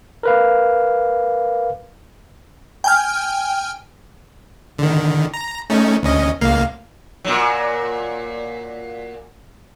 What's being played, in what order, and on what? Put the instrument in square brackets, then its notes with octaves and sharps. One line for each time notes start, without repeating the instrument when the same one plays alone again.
[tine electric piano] A#4 B4 F5
[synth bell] G5 G#5 F6
[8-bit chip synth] D3 D#3
A#5
A3 C#4 D#4
D2 C#4 D#5
C#2 A#3 F5
[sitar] A#2 F#3